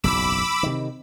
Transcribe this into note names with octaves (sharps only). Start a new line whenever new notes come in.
F#1 B1 E2 B5 D6 E6
C3 D#3